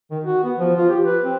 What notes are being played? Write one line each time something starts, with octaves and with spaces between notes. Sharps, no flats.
D#3
F#4
B3
F3
F4
G4
B4
C4